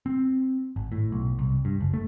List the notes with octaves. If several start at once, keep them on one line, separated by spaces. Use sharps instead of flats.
C4
G#1
A2
B1
C2
G2
F#1
A3